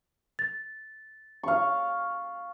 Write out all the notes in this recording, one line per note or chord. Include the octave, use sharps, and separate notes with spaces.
A6
F5 C#6